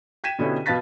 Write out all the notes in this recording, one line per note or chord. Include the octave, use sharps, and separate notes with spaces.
G5 G#6 B6 D#7 E7
B2 D3 B3 C#4 E4 G4
B2 B4 F5 A5 A6 B6